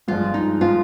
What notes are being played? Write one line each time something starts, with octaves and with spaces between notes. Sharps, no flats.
G2 F3 G#3 F4
D#4
F3 G#3 F4